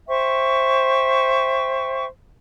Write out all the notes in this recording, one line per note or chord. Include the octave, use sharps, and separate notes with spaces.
C5 E5 G5 C#6